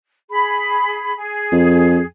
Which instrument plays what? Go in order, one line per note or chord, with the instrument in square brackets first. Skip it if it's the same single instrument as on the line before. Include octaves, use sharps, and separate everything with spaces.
[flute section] G#4 B5
G#4
[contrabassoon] F2